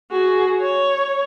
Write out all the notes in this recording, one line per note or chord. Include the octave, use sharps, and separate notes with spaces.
F#4 G#4
C#5